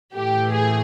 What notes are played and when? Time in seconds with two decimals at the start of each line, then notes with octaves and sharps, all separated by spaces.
0.14 A2 E3 A3 G4
0.53 G#4